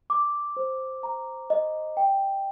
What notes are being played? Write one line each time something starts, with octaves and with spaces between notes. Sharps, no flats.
D6
C5
A#5
D#5
G5